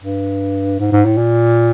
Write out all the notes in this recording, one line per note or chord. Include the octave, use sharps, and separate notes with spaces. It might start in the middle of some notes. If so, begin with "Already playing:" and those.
G2
G#2
G#2
A2
A#2